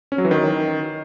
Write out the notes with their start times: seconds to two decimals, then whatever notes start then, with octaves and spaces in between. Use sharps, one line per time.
0.12 C#4
0.18 F#3
0.25 E3
0.31 D#3